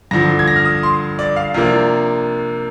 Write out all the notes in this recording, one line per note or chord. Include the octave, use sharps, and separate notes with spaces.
G2 D3 F3 A#6
G#6
A#6
F6
D#6
C6
D5
F5
C3 F3 A#3 D4 F5